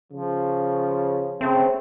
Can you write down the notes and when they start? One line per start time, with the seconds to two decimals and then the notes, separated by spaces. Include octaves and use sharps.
0.12 C#3 F3
1.41 C#3 A3 C4